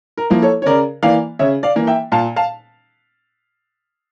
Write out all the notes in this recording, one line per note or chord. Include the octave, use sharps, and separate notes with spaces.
A#4
F3 A#3 E4
A4 C#5
C#5
C#3 A#4 D5
E3 A#3 D5 F5
C#3 C#5 E5
D5 F5
E3 A#3
E5 G5
A#2 F5 A5
F5 A5